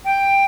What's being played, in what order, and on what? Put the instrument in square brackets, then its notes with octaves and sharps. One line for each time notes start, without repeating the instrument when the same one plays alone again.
[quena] G5